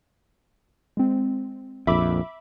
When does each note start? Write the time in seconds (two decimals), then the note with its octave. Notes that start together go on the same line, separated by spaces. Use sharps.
0.97 G#3 C4
1.87 A#1 F2 E5 B5 D6